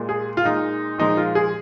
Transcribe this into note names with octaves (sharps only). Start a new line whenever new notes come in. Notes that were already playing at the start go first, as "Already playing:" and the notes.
Already playing: A#2 G#3
G#4
F4
A#2 G#3 D#4
A#2 F3 G#3 D#4
F4
G#4